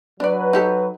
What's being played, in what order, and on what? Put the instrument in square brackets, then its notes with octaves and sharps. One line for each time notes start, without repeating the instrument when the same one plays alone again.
[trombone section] F#3 B4 [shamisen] D4 D5
[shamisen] D#4 G4 A4